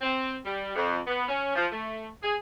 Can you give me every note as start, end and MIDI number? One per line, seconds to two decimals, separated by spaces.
0.01 0.35 60
0.45 0.71 55
0.75 0.98 41
1.07 1.27 59
1.29 1.51 61
1.56 1.66 53
1.72 2.08 57
2.23 2.35 68